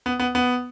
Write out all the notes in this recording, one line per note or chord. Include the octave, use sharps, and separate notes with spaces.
B3
B3
B3